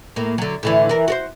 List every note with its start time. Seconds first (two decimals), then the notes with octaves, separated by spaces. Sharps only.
0.16 A2 A#3
0.38 D3 F#3
0.63 A2 D3 E3
0.89 E3 A#4
1.08 F#4 A#4 C5